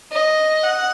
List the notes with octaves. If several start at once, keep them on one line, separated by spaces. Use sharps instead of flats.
D#5
F#5